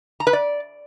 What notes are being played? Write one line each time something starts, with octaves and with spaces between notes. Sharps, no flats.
A#5
B4
D5